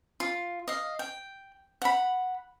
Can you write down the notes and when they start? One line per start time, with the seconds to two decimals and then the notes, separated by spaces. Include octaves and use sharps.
0.20 F4
0.68 D#5 F5
0.99 G5
1.82 F#5 B5